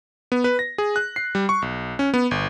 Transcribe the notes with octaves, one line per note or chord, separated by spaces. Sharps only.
B3
B4
A#6
G#4
F#6
C7
G3
C#6
B1
C#4
B3
G1